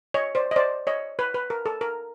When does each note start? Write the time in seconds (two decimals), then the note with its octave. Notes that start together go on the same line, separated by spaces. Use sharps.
0.14 C#5 D#5
0.35 C5 D5
0.51 D#5
0.56 C5 D5
0.87 C#5 D#5
1.19 B4
1.34 B4
1.50 A#4
1.66 A4
1.81 A#4